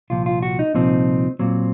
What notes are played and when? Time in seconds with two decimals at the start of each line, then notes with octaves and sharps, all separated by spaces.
0.10 C2 A#2 F3 F4
0.26 F4
0.42 F#4
0.59 D#4
0.74 C2 A#2 F3 C4 D#4
1.39 A#2 F#3 C4